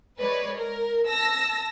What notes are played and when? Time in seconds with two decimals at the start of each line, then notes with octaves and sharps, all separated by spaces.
0.20 G#3 B4 C#5 D5
0.58 A#4
1.07 A5 E6 A#6